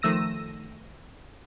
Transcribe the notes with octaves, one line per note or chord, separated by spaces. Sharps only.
D#3 F3 A3 E6 A#6 D#7